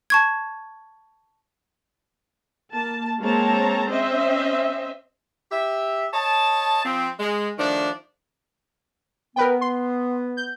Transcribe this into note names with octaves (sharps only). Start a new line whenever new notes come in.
A5 C#6 G#6
A#3 A5
G#3 A#3 C4 C#5 A5 A#5
C4 C#4 C5 D#5 E5
G4 E5
C#5 D#5 A5
F3 C4
G#3
D#3 F3 A3 D4
B3 A#4 B4 G5
C6
G6